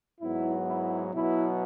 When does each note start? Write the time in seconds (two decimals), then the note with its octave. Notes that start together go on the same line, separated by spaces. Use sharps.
0.21 G#2 F#3 B3 E4
0.67 E4
1.14 B2 F#3 B3 E4